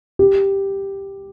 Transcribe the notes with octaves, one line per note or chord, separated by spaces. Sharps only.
G4